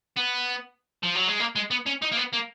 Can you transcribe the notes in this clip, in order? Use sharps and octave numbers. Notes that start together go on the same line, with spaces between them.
B3
F3
F#3
G#3
A#3
G#3
B3
C#4
D#4
A#3
B3
A#3